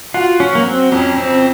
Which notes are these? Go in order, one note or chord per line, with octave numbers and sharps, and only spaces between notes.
F4 F#4
C#4
F#3 A#3
C4
F2 C#4
C4
C#3